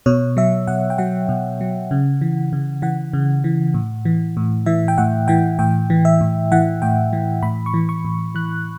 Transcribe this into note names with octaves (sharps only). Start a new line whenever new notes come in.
B2 C#5
F#3 E5
B2 F#5
G5
F#3 F#5
B2
F#3
C#3
E3
C#3
E3 F#5
C#3
E3
A2
E3
A2
E3 E5
G5
A2 F#5
E3 G5
A2 G5
E3
E5
A2
E3 F#5
A2 G5
E3
A2 B5
C#6
E3
C#6
A2
E3 F#6